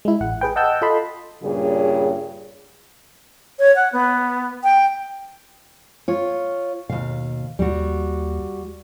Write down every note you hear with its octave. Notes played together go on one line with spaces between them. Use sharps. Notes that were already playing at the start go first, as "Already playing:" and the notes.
G#3 E4
A1 F#5
G#4 B4 G5
D#5 F#5 G5 A5 E6 G6
F4 A4 D#5 A5 B5 C6
G2 A#2 C#3 G3 G#4 C#5
C#5
F#5
B3
G5
F4 C#5
D#2 B2 F5
D#2 G3 F#4